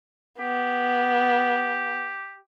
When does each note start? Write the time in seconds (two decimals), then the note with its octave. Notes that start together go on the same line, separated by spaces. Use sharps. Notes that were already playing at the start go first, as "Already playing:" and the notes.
0.40 B3 G4